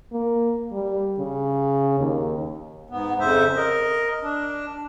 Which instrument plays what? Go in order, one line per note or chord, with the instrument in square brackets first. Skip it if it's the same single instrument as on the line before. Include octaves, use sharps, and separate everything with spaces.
[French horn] A#3
G3
C#3
D#2
[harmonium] G#2 B3
F2 C#3 C5 E5
A#4 D#5
D4